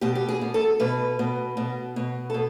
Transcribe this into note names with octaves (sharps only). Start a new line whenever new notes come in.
B2 G4
G4
G#4
B2
A4
B2 B4
B2
B2
B2
A4
B2